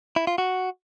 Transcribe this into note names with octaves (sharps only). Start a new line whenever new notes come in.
E4
F4
F#4